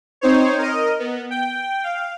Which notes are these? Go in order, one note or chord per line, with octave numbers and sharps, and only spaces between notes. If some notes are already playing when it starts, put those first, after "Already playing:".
C4 D#4 C5 C#5
A#4 D#5
B3
G5
F5